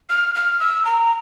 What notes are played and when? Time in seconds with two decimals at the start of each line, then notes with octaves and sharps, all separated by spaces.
0.09 F6
0.35 F6
0.60 E6
0.85 A#5